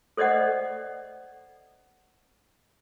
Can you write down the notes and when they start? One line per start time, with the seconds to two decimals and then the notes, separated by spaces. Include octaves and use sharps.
0.17 A4 C5 D5 D#5 F#5